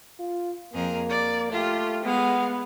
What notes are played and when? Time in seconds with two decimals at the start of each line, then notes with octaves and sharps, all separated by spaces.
0.19 F4
0.73 F2 A#3 G#4 A#4
1.10 D5
1.51 A3 F4 G4
2.04 G#3 B3 F5